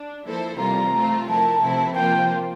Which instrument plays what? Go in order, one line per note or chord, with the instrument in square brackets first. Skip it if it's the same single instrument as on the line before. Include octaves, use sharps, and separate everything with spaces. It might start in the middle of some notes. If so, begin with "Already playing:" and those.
Already playing: [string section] D4
F3 A#3 E4 A4 C5
[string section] C3 E3 G3 A#3 F4 [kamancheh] A#5
[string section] A3 C4 F4
[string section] F3 A3 E4 A#4 [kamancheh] A5
[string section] C3 F3 A3 C4 E4
[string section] F3 A#3 F4 C5 [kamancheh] G5